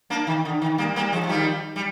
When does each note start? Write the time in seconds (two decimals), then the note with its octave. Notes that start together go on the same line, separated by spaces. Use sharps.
0.10 A#3 D4
0.27 D#3
0.45 D3
0.62 D#3
0.78 G3 A#3
0.96 G3 A#3
1.12 F3 G#3
1.23 F3
1.29 D#3 G3
1.76 G3